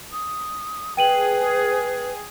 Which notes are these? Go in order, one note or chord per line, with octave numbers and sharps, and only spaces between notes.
D#6
G#4 B4 G5 D#7 F#7